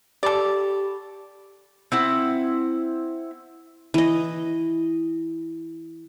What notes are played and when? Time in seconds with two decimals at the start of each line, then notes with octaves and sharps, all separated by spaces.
0.23 G4 A4 D5 B5
1.92 C4 E4 F#5
3.94 E3 D#5